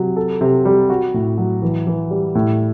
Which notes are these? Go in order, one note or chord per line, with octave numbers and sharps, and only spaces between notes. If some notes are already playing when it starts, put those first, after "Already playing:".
Already playing: C3 F#3
A4
C3
G3
F#4
A2
F#3
E3
E3
G3
A2